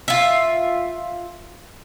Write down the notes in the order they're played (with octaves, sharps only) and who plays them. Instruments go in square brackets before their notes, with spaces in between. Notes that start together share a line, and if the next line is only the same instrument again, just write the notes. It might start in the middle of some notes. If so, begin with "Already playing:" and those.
[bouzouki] F4 E5